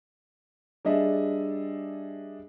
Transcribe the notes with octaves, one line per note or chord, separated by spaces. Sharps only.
G3 D4 G#4 D#5 E5